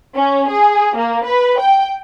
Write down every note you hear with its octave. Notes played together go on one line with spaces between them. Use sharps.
C#4
G#4
A#3
B4
G5